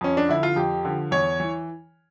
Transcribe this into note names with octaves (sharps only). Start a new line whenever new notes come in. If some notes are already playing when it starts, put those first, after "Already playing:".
F2 C#4
D4
D3 F3 E4
F4
F2 G4
D3 F3
E2 C#5
E3